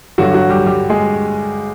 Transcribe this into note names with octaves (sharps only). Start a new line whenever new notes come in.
G2 D3 F#3 G3 F#4
F#3 F#4
G3 G4
G3 G4
G#3 G#4